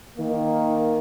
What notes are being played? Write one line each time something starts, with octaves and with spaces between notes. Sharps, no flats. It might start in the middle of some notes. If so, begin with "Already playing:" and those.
D#3 A#3